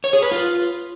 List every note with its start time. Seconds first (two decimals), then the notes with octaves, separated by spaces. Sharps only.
0.04 C#5
0.13 G#4
0.22 B4
0.32 F4